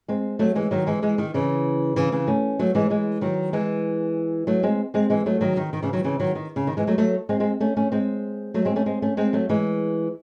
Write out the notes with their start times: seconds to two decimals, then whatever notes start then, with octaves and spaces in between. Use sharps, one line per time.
0.08 G#3 C4
0.39 F#3 A3
0.55 E3 G#3
0.71 D#3 F#3
0.87 E3 G#3
1.02 E3 G#3
1.18 D#3
1.34 C#3 E3
1.96 C#3 E3
2.12 C#3 E3
2.28 A3 C#4
2.59 F#3 A3
2.75 E3 G#3
2.90 E3 G#3
3.21 D#3 F#3
3.53 E3 G#3
4.47 F#3 A3
4.63 G#3 C4
4.94 G#3 C4
5.10 E3 G#3
5.26 F#3 A3
5.41 D#3 F#3
5.57 D#3
5.73 D#3
5.83 C#3 E3
5.93 D#3 F#3
6.04 C#3 E3
6.20 D#3 F#3
6.35 D#3
6.56 C#3
6.67 D#3
6.77 E3 G#3
6.87 F#3 A3
6.98 F#3 A3
7.29 G#3 C4
7.40 G#3 C4
7.60 A3 C#4
7.77 A3 C#4
7.92 G#3 C4
8.54 F#3 A3
8.65 G#3 C4
8.76 A3 C#4
8.86 G#3 C4
9.02 A3 C#4
9.17 G#3 C4
9.33 F#3 A3
9.49 E3 G#3